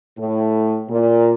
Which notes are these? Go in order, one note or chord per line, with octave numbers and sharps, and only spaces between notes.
A2
A#2